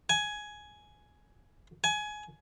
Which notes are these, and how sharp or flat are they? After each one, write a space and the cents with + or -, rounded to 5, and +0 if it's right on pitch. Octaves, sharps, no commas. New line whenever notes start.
G#5 +10
G#5 +20